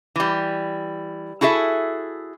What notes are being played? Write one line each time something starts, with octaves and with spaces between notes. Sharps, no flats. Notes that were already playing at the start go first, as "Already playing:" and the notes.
E3 G3
E4 F#4 G#4 A4 E5